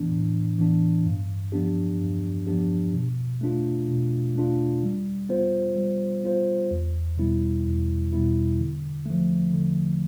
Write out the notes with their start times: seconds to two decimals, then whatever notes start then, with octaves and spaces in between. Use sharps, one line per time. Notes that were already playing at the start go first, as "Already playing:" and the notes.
Already playing: A2 E3 B3 D4
0.11 A2
0.58 E3 B3 D4
1.06 G2
1.52 F3 B3 D4 G4
2.00 G2
2.47 F3 B3 D4 G4
2.93 B2
3.41 A3 D4 F4
3.88 B2
4.35 A3 D4 F4
4.83 G3
5.29 B3 F4 C5
5.76 G3
6.24 B3 F4 C5
6.71 E2
7.17 B2 G3 B3 E4
7.65 E2
8.13 B2 G3 B3 E4
8.59 D3
9.06 F3 A3
9.53 D3